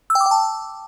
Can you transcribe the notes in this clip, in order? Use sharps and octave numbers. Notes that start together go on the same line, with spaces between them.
E6
G5
D6
G5
A5